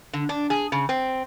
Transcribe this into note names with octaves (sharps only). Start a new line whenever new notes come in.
D3
D4
G#4
C#3
C4